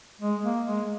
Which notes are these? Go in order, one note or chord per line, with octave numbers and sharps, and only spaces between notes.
G#3
A#3
G#3